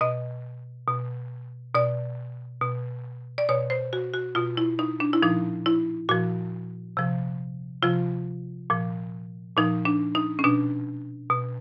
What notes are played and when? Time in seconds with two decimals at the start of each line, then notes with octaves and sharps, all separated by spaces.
0.01 B2 D#5
0.88 B2
1.75 B2 D5
2.61 B2
3.38 D5
3.49 B2 C#5
3.70 C5
3.93 F#4
4.14 F#4
4.35 B2 F4
4.57 E4
4.79 D#4
5.00 D4
5.13 E4
5.22 A#2 F3 D#4
5.66 E4
6.09 A#2 F3 F#4
6.97 C3 F3
7.83 C3 F3 F4
8.70 A#2 F3
9.57 A#2 F3 D#4
9.85 D4
10.15 D#4
10.39 C#4
10.44 B2 D4
11.30 B2